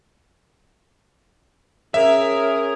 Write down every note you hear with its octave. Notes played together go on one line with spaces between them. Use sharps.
C#4 G#4 A#4 E5